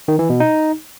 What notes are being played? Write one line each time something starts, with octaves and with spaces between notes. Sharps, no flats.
D#3
E3
B2
D#4